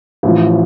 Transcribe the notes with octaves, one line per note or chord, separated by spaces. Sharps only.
A1 A2 F3